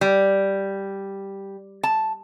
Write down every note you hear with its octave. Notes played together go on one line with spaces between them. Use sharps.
G3
A5